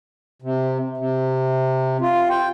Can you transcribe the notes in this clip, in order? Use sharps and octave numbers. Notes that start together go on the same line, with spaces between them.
C3
C3
F4
G5